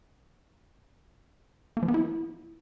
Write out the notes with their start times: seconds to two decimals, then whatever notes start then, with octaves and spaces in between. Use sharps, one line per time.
1.77 A#3
1.83 F3
1.88 B3
1.94 E4